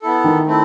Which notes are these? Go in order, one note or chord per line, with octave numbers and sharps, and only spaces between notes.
B3 E4 A4
D#3
A3 C4 E4